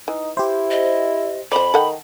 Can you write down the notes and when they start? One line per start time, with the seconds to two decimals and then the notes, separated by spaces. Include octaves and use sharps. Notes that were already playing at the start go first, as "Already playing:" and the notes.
0.08 E3 D#4
0.37 E4 G4 C5
0.71 D#5
1.52 F2 C5 D5 B5
1.74 D#3 A4 F#5 G5